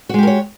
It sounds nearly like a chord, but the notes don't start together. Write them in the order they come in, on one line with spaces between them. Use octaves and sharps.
F#4 G#3 G4 A#4 C#5